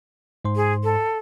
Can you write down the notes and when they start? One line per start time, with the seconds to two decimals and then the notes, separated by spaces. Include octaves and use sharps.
0.45 G#2 C5 C6
0.56 G#4
0.84 A4